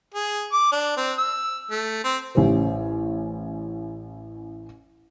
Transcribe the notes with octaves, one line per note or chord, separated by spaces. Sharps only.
G#4
D6
D4
C4
E6
A3
C4
A1 C#4 G4 C5